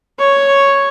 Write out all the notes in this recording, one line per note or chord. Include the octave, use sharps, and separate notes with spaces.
C#5